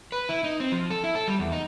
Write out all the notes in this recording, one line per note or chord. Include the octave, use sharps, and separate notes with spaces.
B4
E4
D#4
C4
F3
A4
E4
A4
G3
E2
D#4